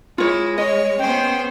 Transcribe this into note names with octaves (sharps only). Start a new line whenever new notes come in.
G#3 E4 F4 C#5
C#5 D#5
B3 C#4 G#4 C5 G5